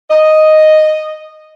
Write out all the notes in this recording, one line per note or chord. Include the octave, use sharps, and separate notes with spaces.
D#5